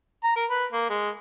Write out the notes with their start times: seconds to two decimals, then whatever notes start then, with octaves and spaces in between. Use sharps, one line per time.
0.23 A#5
0.36 A#4
0.50 B4
0.72 A#3
0.89 G#3